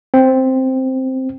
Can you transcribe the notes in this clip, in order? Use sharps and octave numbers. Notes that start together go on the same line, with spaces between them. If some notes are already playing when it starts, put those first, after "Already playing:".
C4